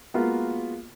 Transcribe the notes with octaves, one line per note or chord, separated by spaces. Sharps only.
G#3 A#3 B3 F4 F#4 A#4